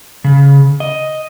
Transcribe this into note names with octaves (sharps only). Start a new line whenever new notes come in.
C#3
D#5